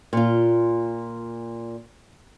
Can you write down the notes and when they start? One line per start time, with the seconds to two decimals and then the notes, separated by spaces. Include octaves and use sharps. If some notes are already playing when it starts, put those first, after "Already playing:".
0.13 A#2 F4